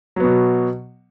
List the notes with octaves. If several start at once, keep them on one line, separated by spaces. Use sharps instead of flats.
B2 F#3 B3